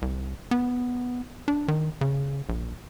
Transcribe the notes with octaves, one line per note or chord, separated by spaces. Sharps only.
C2
B3
D4
D#3
C#3
A#1